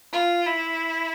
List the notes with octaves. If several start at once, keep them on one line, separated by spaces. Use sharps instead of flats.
F4
E4